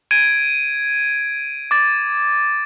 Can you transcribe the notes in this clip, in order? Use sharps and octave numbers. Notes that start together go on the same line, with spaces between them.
G#6 D7 D#7
D6 A6